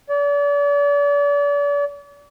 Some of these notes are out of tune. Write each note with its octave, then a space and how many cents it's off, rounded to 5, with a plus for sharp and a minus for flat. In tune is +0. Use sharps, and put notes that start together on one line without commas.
D5 -40